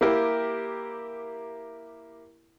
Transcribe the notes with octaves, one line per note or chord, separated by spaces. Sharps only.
A#3 E4 G4 A#4